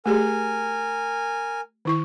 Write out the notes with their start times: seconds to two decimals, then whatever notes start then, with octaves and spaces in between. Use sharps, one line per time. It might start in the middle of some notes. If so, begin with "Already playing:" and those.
0.06 A3 G4 G#4 A#4 G#5
1.85 D#3 E4 C#6